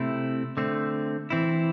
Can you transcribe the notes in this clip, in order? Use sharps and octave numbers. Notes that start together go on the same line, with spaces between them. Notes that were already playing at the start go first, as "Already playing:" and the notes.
Already playing: C3 A3 C4 E4
D3 A3 C4
E3 C4 E4